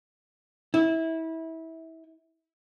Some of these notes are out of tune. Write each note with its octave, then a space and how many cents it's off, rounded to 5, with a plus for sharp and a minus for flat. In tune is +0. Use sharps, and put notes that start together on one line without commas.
E4 -25